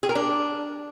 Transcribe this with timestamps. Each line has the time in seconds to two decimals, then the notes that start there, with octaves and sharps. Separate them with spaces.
0.03 G#4
0.09 A#4
0.15 D4